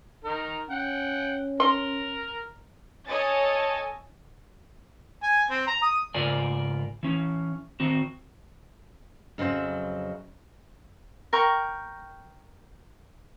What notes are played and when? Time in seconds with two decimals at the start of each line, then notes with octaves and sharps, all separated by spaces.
0.24 D#4 A#4
0.70 C#4 F#5 G5
1.60 A#4 C6
3.07 A4 C#5 D#5 G#5 A6
5.23 G#5
5.50 C4
5.67 A#5
5.82 D#6
6.14 G#2 C#3 F4 A#4 D5 G#5
7.03 E3 C#4
7.80 D#3 C4 F#4
9.38 F2 C#3 F#3 C5 E5
11.33 A#4 G5 C#6